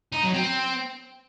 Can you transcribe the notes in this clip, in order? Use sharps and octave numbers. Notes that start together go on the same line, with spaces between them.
D#4
F#3
C4